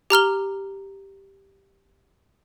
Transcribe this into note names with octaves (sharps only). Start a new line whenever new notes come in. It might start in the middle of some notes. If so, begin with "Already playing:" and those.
G4 A#5 F6 G7